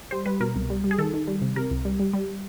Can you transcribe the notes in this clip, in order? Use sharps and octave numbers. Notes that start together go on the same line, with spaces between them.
G3 C5
G3 B4
B2 A#4
C2
G3
G3
G#4
D#3 A4
D#3
G3
C3
C3 A#4
C2
G3
G3
G3